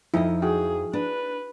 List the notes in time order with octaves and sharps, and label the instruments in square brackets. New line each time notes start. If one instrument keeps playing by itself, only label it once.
[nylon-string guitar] F2 D#5 [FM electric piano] F3 [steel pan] D#4 E4
[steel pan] D#4 F#4 G5 [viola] G#4
[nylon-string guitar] D4 [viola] B4